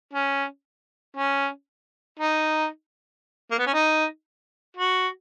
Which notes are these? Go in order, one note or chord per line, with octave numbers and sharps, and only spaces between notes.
C#4
C#4
D#4
A#3
B3
C#4
D#4
F#4